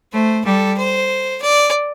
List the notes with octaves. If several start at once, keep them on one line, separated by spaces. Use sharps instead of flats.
A3 C5
G3 A4
C5
D5